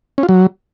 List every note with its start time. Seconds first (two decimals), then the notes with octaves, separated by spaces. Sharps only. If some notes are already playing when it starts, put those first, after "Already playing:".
0.18 C#4
0.23 F4
0.29 F#3